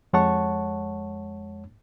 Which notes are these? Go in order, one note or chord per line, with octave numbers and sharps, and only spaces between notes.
F2 G#3 C#5 F#5 A5 C#6